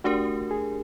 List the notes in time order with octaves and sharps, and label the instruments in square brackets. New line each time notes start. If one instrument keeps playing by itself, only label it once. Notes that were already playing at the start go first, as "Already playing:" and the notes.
[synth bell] A3 D4 G4 A#4 [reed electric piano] F#4
[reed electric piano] G#4